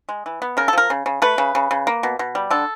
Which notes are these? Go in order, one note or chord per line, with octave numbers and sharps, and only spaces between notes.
G#3
E3
B3
C#3 A#4
A4
F3 A#4
C#3
C#3
A3 B4
C#3
C#3
C#3
A#3
B2
B2
G3
D3 A4